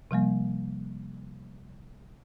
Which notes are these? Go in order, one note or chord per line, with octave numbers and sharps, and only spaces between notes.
C3 F3 G3 A#3